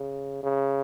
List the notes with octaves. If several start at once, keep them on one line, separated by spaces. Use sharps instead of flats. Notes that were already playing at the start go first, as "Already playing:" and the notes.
Already playing: C#3
C#3